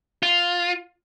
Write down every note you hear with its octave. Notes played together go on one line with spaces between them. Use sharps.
F4